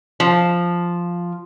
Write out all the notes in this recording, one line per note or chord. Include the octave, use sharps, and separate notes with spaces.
F3